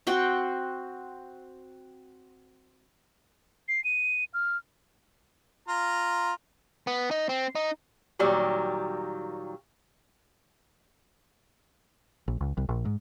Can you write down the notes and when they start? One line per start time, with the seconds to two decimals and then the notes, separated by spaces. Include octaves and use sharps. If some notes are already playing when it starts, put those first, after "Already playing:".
0.07 C4 F#4 G5
3.68 C7
3.84 D#7
4.34 F6
5.68 F4 A#5
6.87 B3
7.11 D#4
7.29 C4
7.55 D#4
8.19 A#2 D#3 F#3 G3
12.28 A#1
12.41 C#2
12.57 C2
12.69 A#1
12.85 G#2